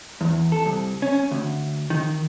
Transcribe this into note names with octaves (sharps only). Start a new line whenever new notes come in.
E2
A4
C2
C#4
D2
D#3